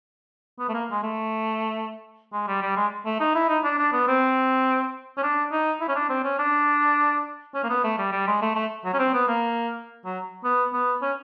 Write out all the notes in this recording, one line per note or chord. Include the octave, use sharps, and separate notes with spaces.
B3
A3
A#3
G#3
A3
G#3
G3
G3
G#3
A3
D#4
E4
D#4
D4
D4
B3
C4
C#4
D4
D#4
E4
C#4
D4
C4
C#4
D4
C#4
A#3
B3
A3
G3
G3
G#3
A3
A3
F#3
C#4
C4
B3
A#3
F#3
B3
B3
C#4